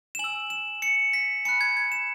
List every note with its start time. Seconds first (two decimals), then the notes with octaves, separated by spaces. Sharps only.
0.15 E7
0.19 G#5 F#7
0.24 E6
0.50 E7
0.82 C#7
1.13 B6
1.45 G#5 B5 F#6 C#7
1.61 G#6
1.77 G#6
1.92 E7